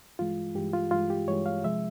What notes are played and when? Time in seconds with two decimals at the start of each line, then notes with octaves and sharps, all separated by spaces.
0.19 G2 E3 G#3 F4
0.55 G2 E3 G#3 G4
0.73 F4
0.91 G2 E3 G#3 F4
1.10 G4
1.28 G2 E3 G#3 C#5
1.46 F5
1.63 C3 F3 G#3 E5